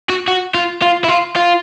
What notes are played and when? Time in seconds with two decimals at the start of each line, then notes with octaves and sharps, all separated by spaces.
0.10 F#4
0.28 F#4
0.54 F4
0.82 F4
1.04 E4
1.08 F4
1.36 F4